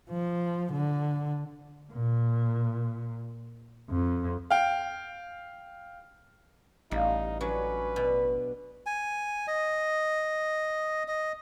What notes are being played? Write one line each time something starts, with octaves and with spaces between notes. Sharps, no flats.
F3
D3
A#2
F2
F5 G5
A1 G3 D#4 F5
F#3 C#4 D4 B4
B2 D4
G#5
D#5
D#5